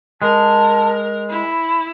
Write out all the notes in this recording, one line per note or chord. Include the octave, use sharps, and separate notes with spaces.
G#3 A#4 A5
E4 B5